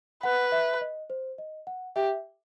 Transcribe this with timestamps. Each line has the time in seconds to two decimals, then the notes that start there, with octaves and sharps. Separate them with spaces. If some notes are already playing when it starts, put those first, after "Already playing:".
0.23 B4 F#5
0.52 E5
0.81 D#5
1.10 C5
1.38 D#5
1.67 F#5
1.96 G4 E5